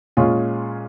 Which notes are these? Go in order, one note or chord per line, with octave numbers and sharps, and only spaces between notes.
A#2 G#3 C#4 F4 G#4